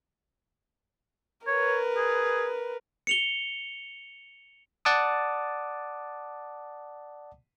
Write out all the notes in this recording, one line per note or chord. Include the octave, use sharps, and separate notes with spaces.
A#4 B4 C#5
G#4
C#7 F7 G7
D5 F#5 A5 D6 D#6